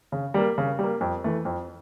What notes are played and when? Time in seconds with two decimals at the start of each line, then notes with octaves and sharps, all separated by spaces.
0.12 C#3
0.34 G3 A#3
0.58 C#3
0.79 G3 A#3
1.01 F2
1.24 E3 A3
1.45 F2